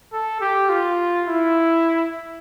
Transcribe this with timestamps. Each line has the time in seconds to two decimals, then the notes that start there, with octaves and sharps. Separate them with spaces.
0.13 A4
0.41 G4
0.69 F4
1.28 E4